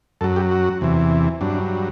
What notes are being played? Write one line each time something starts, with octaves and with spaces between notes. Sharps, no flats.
F#2 F#3 A4
G4
F#4
E2 C3 E3
G2 F#3 D4